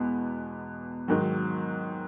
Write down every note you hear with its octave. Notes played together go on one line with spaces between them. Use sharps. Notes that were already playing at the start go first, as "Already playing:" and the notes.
Already playing: E2 B2 G#3 B3
G#2 D#3 F#3